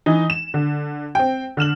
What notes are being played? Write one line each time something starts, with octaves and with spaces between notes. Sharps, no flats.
E3 D#4
E7
D3
C4 G5
D3 F6 E7 F#7